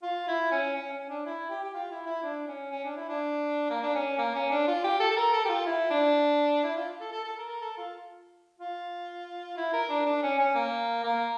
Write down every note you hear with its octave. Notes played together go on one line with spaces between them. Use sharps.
F4
E4
C#4
C#4
C#4
D4
E4
G4
G4
F4
E4
E4
D4
C#4
C#4
D4
E4
D4
A#3
D4
C#4
A#3
C#4
D4
F4
G4
A4
A4
A#4
A4
G4
F4
E4
D4
E4
F4
A4
A4
A4
A#4
A#4
A4
F4
F4
E4
A#4
D4
D4
C#4
C#4
A#3
A#3